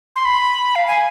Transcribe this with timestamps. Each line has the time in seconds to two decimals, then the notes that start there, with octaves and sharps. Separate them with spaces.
0.16 C6
0.25 B5
0.75 F5
0.88 G#5